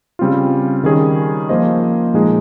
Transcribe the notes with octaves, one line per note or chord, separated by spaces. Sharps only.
C#3 G3 C4 F4
D#3 G3 C#4 G#4 D#5
F3 A#3 F4 C5 D#5
A#2 F3 G#3 D#4 G#4